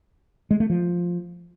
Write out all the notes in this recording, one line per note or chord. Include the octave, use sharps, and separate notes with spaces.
G#3
A3
F3